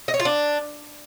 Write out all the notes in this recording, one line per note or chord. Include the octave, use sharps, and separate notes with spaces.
D#5
C#5
F4
D4